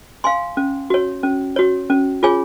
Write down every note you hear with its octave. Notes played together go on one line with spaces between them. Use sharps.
F5 G#5 C6
C#4
F#4 C#5
C#4
F#4 C#5
C#4
F4 G#4 C#5 G#5